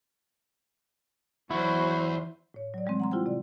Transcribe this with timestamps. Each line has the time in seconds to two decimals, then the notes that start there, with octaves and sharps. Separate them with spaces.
1.50 E2 F#3 E4 F#4 C5
2.54 A2 C#5
2.74 F#3 D5
2.86 E3 G3 G#3 C4
3.00 F#5 A#5 C6
3.11 E4 F4 G4 C5 G5 C6
3.26 C3 D5